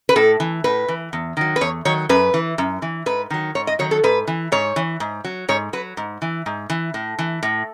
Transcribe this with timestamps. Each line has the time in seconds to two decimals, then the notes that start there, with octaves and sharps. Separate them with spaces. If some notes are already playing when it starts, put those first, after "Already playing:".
0.09 B4
0.16 A2 A4
0.40 E3
0.64 A2 B4
0.88 E3
1.13 E2
1.37 D#3 F#3
1.56 B4
1.61 E2 C#5
1.85 D#3 F#3 C#5
2.09 F#2 B4
2.34 E3
2.58 F#2
2.82 E3
3.06 G#2 B4
3.30 D#3 F#3
3.55 G#2 C#5
3.67 D#5
3.79 D#3 F#3 C#5
3.91 A4
4.04 G#2 B4
4.27 E3
4.52 G#2 C#5
4.76 E3
5.00 G#2
5.24 F#3
5.49 G#2 C#5
5.73 F#3 B4
5.97 G#2
6.22 E3
6.46 G#2
6.70 E3
6.94 A2
7.19 E3
7.43 A2